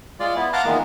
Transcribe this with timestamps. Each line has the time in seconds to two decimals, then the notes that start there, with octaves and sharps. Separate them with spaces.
0.20 G#3 F4 D5
0.36 B3 E4
0.53 F5 F#5 A5 A#5 C6 D6
0.65 A#2 D#3 E3 G#3 A#3 B3